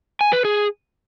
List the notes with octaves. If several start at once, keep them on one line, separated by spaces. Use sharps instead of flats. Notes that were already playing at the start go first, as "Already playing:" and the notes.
G#5
B4
G#4